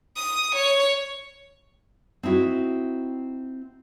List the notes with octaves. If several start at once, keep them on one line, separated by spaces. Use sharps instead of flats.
D#6
C#5
C4 D#4 E4 F#4